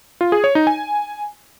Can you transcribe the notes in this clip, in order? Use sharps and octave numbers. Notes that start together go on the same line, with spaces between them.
F4
G#4
C#5
D#4
G#5